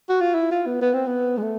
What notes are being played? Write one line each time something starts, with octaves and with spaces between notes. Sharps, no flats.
F#4
F4
E4
F4
B3
B3
C4
B3
G#3
A3